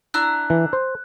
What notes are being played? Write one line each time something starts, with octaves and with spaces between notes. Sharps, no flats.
D4 E4 A#5 F#6
E3
C5